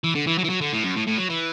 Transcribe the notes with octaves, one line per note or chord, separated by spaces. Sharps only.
E3
D3
E3
F#3
E3
F#3
D3
A2
F#2
A2
A2
F#3
E3